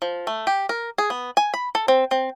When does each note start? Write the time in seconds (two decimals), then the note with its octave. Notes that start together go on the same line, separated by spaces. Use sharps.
0.02 F3
0.27 A3
0.47 G4
0.69 A#4
0.98 G#4
1.10 B3
1.37 G#5
1.54 B5
1.75 A4
1.88 C4
2.11 C4